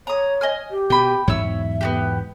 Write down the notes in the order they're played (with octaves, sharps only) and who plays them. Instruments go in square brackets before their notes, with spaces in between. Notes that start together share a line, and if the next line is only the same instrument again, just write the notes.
[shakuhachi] C#5 [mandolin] A#5 D#6
[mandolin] D#5 G#5 F6
[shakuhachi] G4
[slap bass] B2 [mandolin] G5 B5
[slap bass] E2 G#2 F#3 [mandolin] C#5 E6 [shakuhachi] E5
[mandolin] B3 F#4 G4